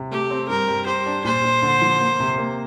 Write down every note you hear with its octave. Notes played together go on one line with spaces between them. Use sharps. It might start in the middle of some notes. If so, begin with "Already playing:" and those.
Already playing: C3
A3 G4
C4
G2 A#4
G3
G4 C5
D4
A#2 C5
A#2
D3
F3
A#3
C3
A#3